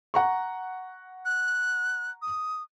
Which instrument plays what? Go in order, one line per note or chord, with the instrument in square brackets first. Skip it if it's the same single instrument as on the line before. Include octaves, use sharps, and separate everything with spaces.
[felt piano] F#5 A#5 C#6
[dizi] F#6
D#6